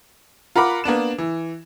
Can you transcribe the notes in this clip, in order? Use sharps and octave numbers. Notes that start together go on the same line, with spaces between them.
F4 A#4 F#5 B5 D6
A#3 B3 D4 E7
E3